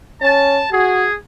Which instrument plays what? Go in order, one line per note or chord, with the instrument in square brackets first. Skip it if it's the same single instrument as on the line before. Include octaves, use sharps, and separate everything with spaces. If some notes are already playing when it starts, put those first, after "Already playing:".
[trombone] C#4 [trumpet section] A5
[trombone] F#4 [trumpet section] G#4